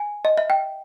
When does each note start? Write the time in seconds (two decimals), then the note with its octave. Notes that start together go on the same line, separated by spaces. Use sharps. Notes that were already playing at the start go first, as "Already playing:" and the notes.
Already playing: G#5
0.25 D#5
0.38 E5
0.50 G5